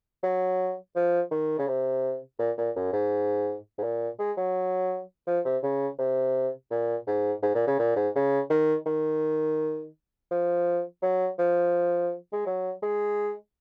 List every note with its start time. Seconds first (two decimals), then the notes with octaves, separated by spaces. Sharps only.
0.23 F#3
0.96 F3
1.31 D#3
1.59 C#3
1.68 C3
2.39 A#2
2.58 A#2
2.76 F#2
2.93 G#2
3.78 G#2
3.83 A#2
4.19 G#3
4.38 F#3
5.27 F3
5.45 C3
5.63 C#3
5.99 C3
6.71 A#2
7.07 G#2
7.42 G#2
7.55 A#2
7.67 C#3
7.79 A#2
7.96 G#2
8.15 C#3
8.50 D#3
8.86 D#3
10.31 F3
11.03 F#3
11.39 F3
12.33 G#3
12.46 F#3
12.83 G#3